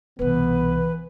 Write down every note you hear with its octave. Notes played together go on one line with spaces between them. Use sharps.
C2 B2 E3 B3 B4